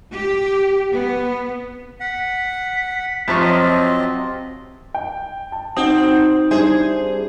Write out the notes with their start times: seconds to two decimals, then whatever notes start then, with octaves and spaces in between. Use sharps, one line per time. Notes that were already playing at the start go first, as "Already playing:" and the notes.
0.14 G4
0.93 B3
2.00 F#5 B6
3.28 F2 C3 F3 F4 C#6
3.40 F#3 C4 D#5
4.94 G5
5.52 A5
5.77 C4 D#4 F#4 F#5
6.51 G3 D4 E4 G#4 C5